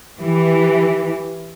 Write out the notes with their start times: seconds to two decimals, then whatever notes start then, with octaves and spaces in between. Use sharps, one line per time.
0.22 E3 G4